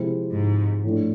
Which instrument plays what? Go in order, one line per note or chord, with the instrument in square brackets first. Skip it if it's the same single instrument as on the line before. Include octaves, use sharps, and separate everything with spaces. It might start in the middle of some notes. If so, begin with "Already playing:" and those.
Already playing: [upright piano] C3 F3 G#3 C4 E4
[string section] G#2
[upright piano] A2 F3 A3 D4